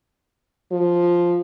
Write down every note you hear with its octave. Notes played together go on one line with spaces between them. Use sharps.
F3